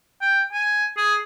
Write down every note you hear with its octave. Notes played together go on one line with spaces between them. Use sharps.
G5
G#5
G#4